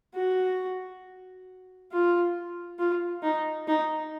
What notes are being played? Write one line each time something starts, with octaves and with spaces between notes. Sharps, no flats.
F#4
F4
F4
D#4
D#4